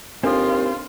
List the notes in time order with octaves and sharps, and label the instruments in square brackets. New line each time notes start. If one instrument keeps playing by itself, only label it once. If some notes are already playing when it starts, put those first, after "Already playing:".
[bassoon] D#2 [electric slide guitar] C4 [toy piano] D4 A4 [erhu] F4